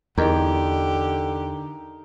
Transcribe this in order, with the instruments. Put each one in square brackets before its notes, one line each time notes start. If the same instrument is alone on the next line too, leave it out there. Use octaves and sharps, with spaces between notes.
[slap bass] E2 [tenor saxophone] D3 [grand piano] D#4 A#4 [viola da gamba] G4